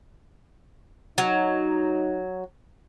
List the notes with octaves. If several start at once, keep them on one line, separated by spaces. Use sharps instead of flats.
F#3 D#4